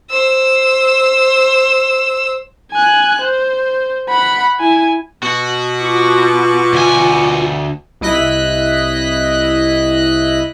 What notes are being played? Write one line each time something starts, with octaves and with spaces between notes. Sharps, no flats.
C5 E6
G#5 F#6
C5
F#5 B5
E4 G#5
B2 F#4
F4 C#6 D6
D2 G#5
C2 E4 D#5 F#6 B6